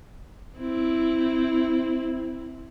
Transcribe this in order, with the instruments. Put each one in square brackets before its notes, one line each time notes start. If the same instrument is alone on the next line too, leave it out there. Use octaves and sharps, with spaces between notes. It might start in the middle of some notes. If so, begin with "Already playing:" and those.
[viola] C4 E4